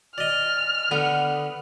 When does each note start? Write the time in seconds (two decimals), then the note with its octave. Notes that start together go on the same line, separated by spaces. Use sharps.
0.18 D5 D#5 F6
0.91 D3 B3